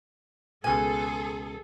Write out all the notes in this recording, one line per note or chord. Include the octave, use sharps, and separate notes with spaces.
C#2 B2 G#4 A4 G#5